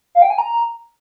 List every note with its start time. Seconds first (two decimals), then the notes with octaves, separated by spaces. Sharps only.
0.15 F5
0.22 G5
0.30 G#5
0.38 A#5